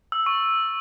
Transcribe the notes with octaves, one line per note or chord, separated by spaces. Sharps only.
E6
C#6